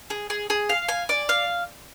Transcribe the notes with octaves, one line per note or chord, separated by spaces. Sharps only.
G#4
G#4
G#4
F5
G#5
D5
F5